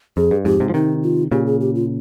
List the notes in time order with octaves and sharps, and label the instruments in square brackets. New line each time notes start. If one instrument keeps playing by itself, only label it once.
[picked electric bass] F2 [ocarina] G#4
[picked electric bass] G2
[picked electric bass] F2 G#2 [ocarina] G4
[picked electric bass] G#2 C3
F3
[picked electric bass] C3 D#3 [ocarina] D#4
[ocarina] F4
[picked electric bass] A#2 C#3 [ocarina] G4
[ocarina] G#4
G4
F4